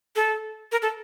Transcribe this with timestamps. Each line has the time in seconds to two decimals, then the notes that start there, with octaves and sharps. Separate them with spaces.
0.16 A4
0.72 A#4
0.82 A4